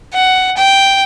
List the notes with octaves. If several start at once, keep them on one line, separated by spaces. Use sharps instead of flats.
F#5
G5